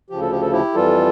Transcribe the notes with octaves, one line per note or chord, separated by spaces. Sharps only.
D2 C#3 F3 G4
A4
G4
A4
E4 G4
F2 E3 G3 F4 A4